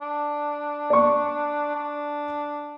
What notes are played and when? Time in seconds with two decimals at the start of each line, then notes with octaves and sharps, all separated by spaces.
0.01 D4
0.90 D5 C#6
1.75 D4